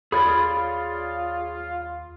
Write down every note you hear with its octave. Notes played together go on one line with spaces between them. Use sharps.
D#2 F4 G#4 C#5 D5 B5